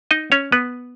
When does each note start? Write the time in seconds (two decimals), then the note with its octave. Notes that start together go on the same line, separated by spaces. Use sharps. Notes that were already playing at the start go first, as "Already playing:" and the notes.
0.11 D#4 D#5
0.32 C#4 C#5
0.52 B3 B4